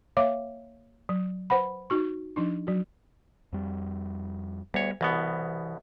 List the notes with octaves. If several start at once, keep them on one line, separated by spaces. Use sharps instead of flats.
A#3 C#5 E5 F5 D6
F#3
B4 C5 F#5 B5
D#4 F#4 C#6
F3 D4 D#4
F#3 F#4
F2 G3
D2 G3 B3 C#5
C2 B2 E3 B3